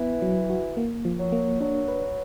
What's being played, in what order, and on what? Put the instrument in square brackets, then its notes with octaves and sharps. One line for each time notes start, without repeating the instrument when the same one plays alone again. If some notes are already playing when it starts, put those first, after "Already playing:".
Already playing: [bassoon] E3 [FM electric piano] B3
[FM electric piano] F#3
F#4
A#3
F3
[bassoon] F#3
[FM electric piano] A#3
[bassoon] F#3 [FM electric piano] D4
[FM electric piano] B4